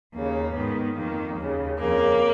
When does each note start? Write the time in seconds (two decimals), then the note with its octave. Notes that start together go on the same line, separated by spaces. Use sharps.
0.15 D#2 C#3 A#3
0.55 G#2 D#3 B3
0.96 F2 D#3 A#3
1.36 D#2 C#3
1.77 F2 C#3 A#3